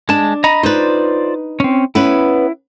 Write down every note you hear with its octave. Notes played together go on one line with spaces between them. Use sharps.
G#3 D4 A5
D#5 A#5 B5
D#4 F4 B4 C5 D5
C4 C#4
B3 C#4 E4 B4